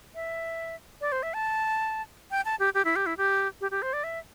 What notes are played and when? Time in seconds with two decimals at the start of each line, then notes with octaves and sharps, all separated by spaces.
0.15 E5
1.01 D5
1.12 C5
1.23 E5
1.34 A5
2.31 G5
2.45 A5
2.60 G4
2.74 G4
2.85 E4
2.96 G4
3.06 E4
3.17 G4
3.61 G4
3.71 G4
3.82 C5
3.93 D5
4.04 E5